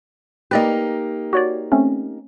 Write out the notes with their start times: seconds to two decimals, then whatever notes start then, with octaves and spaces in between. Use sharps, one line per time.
0.51 A#3 D#4 G4 B4 D5 D#5
1.33 F#4 C#5 D5
1.72 A3 C4 C#4